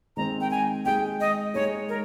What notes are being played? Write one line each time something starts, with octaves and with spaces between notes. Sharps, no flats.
D#3 G#3 C4 A#5
G5
G#5
G#3 D#4 G#4 G5
D#5
G#3 D#4 G#4 C#5
A#4